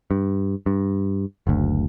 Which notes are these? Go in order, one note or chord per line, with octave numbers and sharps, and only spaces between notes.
G2
G2
F#1 D2